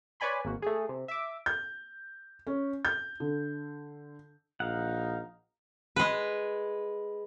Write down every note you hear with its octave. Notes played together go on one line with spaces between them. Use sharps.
B4 C#5 D5 G#5 B5 C6
G#1 A#3 F#4
A3 G#4
C3
E5 D6
G6
C#4
G6
D3
A#1 D#4 F5 F#5
G#3 B4